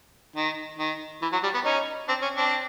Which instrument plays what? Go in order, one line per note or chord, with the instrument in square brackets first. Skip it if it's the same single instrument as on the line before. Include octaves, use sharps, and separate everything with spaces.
[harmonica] D#3
D#3
E3
F#3
G3
B3
C#4 D#4
C4 D4
C#4
C4 D4